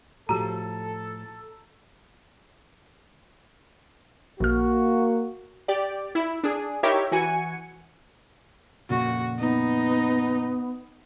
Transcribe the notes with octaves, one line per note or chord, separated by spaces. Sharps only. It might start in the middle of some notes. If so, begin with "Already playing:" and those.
A2 F3 F#4 G4 A4 A#5
A#1 A#3 F#4 F6
G4 D5
E4
D4 G#4
D#4 E4 G4 A#4 C#5 E5
E3 F#4 G#5 C#7
F2 A#2 C#3 F#4
B3 D#4